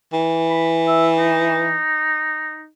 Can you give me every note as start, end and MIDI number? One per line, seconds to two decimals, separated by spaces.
0.13 1.78 52
0.50 0.81 83
0.87 1.08 76
1.18 2.68 63